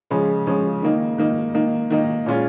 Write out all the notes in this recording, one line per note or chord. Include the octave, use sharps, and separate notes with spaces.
C#3 F3 G#3 C#4
C#3 F3 G#3 C#4
D#3 A#3 D#4
D#3 A#3 D#4
D#3 A#3 D#4
D#3 A#3 D#4
A#2 G#3 C#4 F4